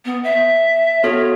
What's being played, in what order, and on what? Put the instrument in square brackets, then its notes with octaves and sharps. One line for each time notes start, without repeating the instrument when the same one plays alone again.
[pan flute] B3
E5
[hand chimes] B3 F#4 A4 [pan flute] C#5